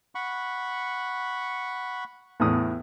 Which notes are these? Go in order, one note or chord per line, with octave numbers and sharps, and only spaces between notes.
F#5 B5 C#6
E2 A2 D#6